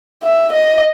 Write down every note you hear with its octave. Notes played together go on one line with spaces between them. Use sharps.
E5
D#5